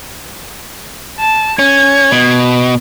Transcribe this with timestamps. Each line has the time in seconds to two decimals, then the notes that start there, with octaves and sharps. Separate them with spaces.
1.19 A5
1.59 C#4 G#6
2.12 B2